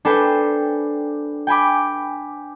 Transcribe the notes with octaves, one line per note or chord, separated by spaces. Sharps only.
D4 A4 B4 C5 G5 G#5
G5 G#5 B5 D6